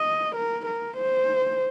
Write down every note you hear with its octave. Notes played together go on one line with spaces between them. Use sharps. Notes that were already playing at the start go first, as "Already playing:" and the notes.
Already playing: D#5
A#4
A#4
C5